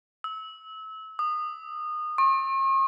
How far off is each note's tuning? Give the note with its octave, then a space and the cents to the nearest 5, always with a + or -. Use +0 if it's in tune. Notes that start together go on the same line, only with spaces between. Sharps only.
E6 -30
D#6 -25
C#6 -45